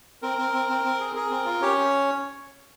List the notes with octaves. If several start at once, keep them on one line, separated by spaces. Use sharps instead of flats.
C4 A#4
C4
C4
C4
C4
G#4
G#4 A#4
C4
F4
C#4 G4 C#5